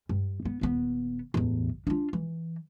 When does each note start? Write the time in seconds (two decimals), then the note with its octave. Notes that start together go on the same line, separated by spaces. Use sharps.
0.09 G2
0.45 B3
0.61 D#1 B3
1.34 A1 E2
1.87 D4 F4
2.13 E3